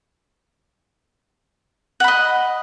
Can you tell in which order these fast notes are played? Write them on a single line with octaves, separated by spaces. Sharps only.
F#5 B5 D#5